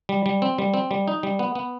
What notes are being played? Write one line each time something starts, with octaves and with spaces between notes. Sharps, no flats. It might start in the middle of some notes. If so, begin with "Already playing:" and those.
G3
G3
C4
G3
C4
G3
D#4
G3
B3
B3